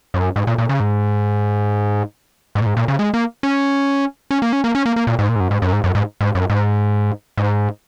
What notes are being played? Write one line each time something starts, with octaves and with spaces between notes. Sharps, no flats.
F#2
G#2
A#2
A#2
C#3
G#2
G#2
A#2
G#2
A#2
C#3
G#3
A#3
C#4
C#4
A#3
C#4
A#3
C#4
A#3
A#3
A#2
G#2
A#2
G#2
F#2
G#2
F#2
G#2
F#2
G#2
G#2
F#2
G#2
G#2